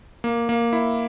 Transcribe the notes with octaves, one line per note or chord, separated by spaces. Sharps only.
A#3
A#3
E4